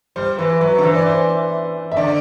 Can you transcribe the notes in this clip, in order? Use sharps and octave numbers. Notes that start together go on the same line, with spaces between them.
G3 C5
E3 B4
F#3 B4
D3
E3 C5
D5
C5
E5
D3 D5